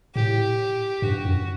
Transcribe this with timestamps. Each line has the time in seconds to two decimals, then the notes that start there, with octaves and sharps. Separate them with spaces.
0.15 A2 G4
1.02 G2 F#4
1.25 F#2